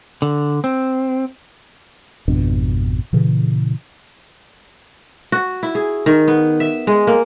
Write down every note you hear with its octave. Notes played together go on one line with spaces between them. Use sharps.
D3
C4
G#1 F2 B2 D4
A#2 C#3 E3
F#4
E4
G#4
D#3
B3
E5
G#3
A#3